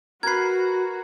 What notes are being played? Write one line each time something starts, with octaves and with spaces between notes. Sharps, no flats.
F#4 A#4 B4 G#6 C7